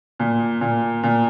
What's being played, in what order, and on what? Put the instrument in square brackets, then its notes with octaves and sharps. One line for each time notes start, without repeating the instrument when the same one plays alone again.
[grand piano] A#2
A#2
A#2